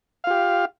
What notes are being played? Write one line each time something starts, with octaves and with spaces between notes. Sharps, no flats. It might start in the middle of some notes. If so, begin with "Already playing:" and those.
F4 G4 F5